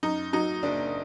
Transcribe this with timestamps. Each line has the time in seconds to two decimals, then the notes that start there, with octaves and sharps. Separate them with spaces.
0.03 F#2 D#4
0.33 F#3 D#4
0.63 F#1 D4